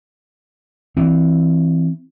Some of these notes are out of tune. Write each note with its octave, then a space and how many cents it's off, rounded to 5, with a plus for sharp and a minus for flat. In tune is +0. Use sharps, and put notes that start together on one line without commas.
E3 +0 C4 +0